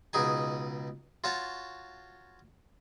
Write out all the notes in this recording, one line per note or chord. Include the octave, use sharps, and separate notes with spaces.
C#2 B2 D#4 G#4 G#5
F4 F#4 C#5 A5